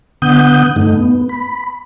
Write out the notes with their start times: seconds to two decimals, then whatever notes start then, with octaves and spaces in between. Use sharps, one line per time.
0.22 D3 B3 F#5 D#6 G6
0.76 G2 A3 D#4
0.96 B3
1.29 B5